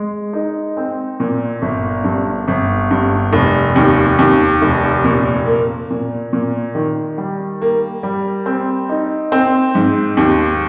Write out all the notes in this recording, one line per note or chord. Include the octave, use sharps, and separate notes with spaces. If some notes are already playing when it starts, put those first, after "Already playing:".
Already playing: G#3
D#4
C4
A#2
G1
G2
G1
G2
F1
D#2
D#2
F1
A#2
A#3
A#2
A#2
D#3
G3
A#3
G3
C4
D#4
C4
G#2
D#2